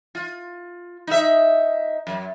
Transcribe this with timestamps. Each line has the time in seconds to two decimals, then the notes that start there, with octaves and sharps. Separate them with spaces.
0.15 F4
1.07 D#4 E5
2.07 F#2